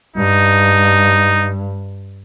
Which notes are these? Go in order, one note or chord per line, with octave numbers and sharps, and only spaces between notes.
G2 D#4